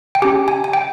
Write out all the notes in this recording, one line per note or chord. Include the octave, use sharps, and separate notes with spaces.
G5
C#4 G4 G#5
G#5
G#5
G5